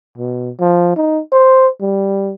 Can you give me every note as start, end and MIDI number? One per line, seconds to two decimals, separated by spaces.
0.18 0.50 47
0.60 0.94 53
0.96 1.20 63
1.32 1.68 72
1.81 2.33 55